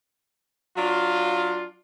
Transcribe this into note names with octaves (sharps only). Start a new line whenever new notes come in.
F#3 D4 F4